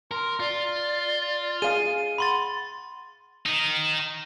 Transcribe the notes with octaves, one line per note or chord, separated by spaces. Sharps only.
A#4 C6
F4 D5
G#4 F5 D#7
F#5 B5 C6 A6
D#3 D#4